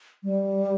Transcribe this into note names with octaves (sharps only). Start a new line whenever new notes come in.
G3